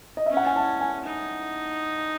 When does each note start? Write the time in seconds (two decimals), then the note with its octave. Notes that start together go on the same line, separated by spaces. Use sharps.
0.17 D#5
0.26 C#4 E5
0.37 F#5
0.46 G#5
0.56 A5
0.81 G#5
1.05 D#4